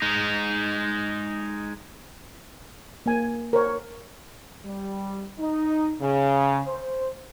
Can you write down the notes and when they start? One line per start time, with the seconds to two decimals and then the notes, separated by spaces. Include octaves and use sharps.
0.02 G#3 D#4
3.06 A#3 G#5
3.53 A#4 C5 C#5
4.65 G3
5.39 D#4
6.01 C#3
6.67 C5